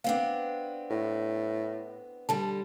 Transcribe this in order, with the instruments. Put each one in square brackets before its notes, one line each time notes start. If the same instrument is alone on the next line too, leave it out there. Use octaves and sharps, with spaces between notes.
[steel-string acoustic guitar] B3 C4 D4 [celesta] F5
[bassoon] A2
[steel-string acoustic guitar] D3 G3 [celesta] A5